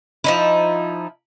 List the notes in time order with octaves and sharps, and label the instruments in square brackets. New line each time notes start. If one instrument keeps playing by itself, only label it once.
[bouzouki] F3 D#4 E4